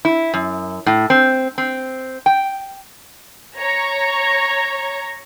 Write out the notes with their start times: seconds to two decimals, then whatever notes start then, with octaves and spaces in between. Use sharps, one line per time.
0.05 E4
0.33 F#2
0.86 A2
1.10 C4
1.58 C4
2.26 G5
3.58 C#5 A#5